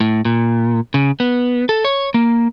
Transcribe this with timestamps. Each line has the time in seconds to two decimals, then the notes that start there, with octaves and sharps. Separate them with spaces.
0.01 A2
0.25 A#2
0.94 C#3
1.20 B3
1.69 A4
1.85 C#5
2.14 A#3